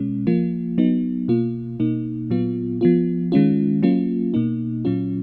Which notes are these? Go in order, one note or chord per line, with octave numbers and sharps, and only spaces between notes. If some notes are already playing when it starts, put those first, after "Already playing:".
Already playing: B2 G#3 C#4
F3 A#3 F4
F#3 B3 D#4
B2 A#3 F4
B2 A#3 D#4
A#2 F#3 B3 F4
F3 B3 F4
D#3 G#3 C#4 F4
F#3 A#3 C#4 F4
B2 A#3 D#4
A#2 F#3 C#4 F4